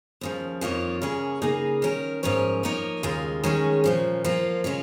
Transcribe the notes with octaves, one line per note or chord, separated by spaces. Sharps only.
D#2 C#3 F3
F2 D#3 A#3 F4 C#5
C#3 A#3 C#4 G#4 C#5
C#3 A#3 D#4 G#4
D#3 C#4 A#4
G#2 F3 C#4 A#4 C#5
F3 A#3 D#4 A#4 C#5
D#2 C#3 G#3 F4
D#3 G#3 C#4 G#4 C#5
A#2 F3 C#4
F3 A#3 F4
C#3 G#3 C#4 F4